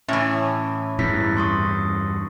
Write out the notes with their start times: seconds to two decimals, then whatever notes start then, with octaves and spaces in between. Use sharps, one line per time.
0.08 A2 E3 C#4 E5
0.99 E2 G2 E4 B6
1.37 C6 C#6 D#6